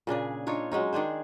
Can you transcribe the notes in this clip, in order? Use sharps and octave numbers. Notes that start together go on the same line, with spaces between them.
A#2 C#3 D4 G#4
D4 D#4 F4 C#5
F#3 G#3 C#4 D#4
D#3 D4 G#4 C5